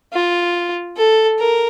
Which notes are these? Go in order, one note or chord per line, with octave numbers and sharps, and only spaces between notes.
F4
A4
A#4